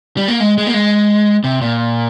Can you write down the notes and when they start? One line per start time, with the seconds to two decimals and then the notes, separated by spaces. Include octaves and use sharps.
0.17 G3
0.28 A#3
0.40 G#3
0.58 G#3
0.67 A#3
0.74 G#3
1.44 C3
1.61 A#2